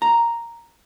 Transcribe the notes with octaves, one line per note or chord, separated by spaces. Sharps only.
A#5